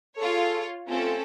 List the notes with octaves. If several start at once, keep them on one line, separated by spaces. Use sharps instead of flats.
F4 G#4 A4 C#5
C3 A3 C4 C#4 F4 A4